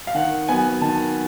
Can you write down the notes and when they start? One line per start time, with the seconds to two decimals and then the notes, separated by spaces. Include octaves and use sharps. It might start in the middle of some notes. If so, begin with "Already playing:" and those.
0.07 F5
0.15 D#3 F#5
0.49 F#3 B3 G#5
0.81 D#3 A5